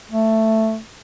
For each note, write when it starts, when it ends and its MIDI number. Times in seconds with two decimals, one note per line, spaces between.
0.11 0.79 57